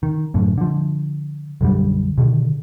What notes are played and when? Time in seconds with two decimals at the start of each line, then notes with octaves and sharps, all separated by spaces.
0.03 D#3
0.34 F#2 A2 D3
0.58 D3 F3
1.61 B1 F#2 D3 G3
2.18 B2 D3 D#3